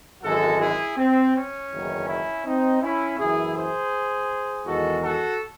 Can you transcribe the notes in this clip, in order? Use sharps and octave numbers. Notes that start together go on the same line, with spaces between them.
G#1 F#2 E3 G#3 F#4 A4
E4 G#4
C4
C#4
F#1 E2 D#3
C#4 E4
C4 D#4
C#4 E4
F#1 F#2 E3 E4 G#4
G#4 C5
E2 D#3 G#3 F#4 A4
F#4 A4